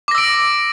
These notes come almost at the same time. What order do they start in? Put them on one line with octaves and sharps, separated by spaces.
D6 A#6 E6 D7